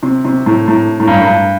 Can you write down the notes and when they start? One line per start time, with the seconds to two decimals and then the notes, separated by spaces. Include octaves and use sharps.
0.03 C3
0.25 C3
0.46 A2
0.68 A2
1.00 A2
1.07 G2
1.21 G2